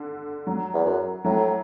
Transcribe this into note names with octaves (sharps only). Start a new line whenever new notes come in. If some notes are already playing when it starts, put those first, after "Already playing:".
Already playing: D3
F#3
E2
F#2
A2 F#3